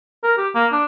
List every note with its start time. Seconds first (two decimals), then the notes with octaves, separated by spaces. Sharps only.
0.23 A#4
0.37 G4
0.55 A#3
0.72 D4